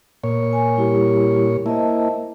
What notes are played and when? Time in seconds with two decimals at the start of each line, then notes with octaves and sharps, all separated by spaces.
0.24 A#2 C#5
0.53 G#5
0.76 G3 E4 G4
1.66 A#3 E4 C5 D#5 A5